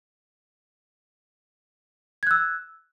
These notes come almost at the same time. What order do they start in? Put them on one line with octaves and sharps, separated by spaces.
G#6 F#6 E6